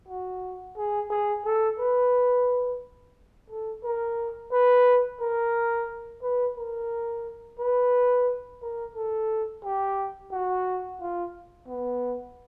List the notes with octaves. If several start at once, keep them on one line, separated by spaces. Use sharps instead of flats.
F#4
G#4
G#4
A4
B4
A4
A#4
B4
A#4
B4
A#4
B4
A#4
A4
G4
F#4
F4
B3